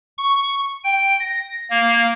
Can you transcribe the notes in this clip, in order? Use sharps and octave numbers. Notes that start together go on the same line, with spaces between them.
C#6
G5
A#6
A#3